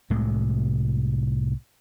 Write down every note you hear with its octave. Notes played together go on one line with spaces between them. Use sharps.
C2 A2 C3 G#3